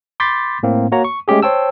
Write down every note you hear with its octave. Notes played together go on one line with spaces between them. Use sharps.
B5 C6 D6 G6 A6 B6
A2 A#3 C4
A#3 F#4 C#5 A#5
C#6
G#3 A3 C#4 G4 G#4
C5 C#5 G5 A5 E6